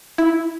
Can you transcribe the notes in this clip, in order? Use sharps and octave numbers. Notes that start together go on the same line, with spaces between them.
E4